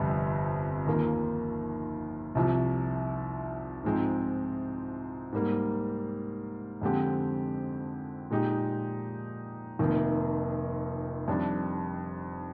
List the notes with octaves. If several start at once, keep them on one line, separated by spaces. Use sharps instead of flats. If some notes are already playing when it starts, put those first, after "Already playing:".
Already playing: G1 F2 C3 G3
D#2 D#3 A#3 F4
C2 C3 F3
G#2 F3 G#3 C4 D#4
G#2 G3 A#3
F2 D3 G#3 C4 G4
A#2 G#3 D#4 G4
F1 F2 D#3 A#3
F2 D#3 G3 D4